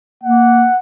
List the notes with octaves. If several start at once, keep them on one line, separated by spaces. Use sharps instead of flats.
A#3 F#5